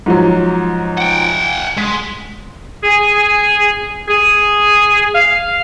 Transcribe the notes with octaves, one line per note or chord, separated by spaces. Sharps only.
G#2 F3 F#3
F#5 G5
G#3 B6
G#4
G#4
F5